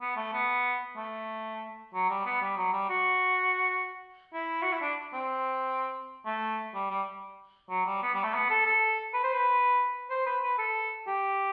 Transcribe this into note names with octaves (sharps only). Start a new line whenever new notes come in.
B3
A3
B3
A3
F#3
G3
B3
G3
F#3
G3
F#4
E4
F#4
E4
D4
C4
A3
G3
G3
F#3
G3
B3
G3
A3
B3
A4
A4
B4
C5
B4
C5
B4
B4
A4
G4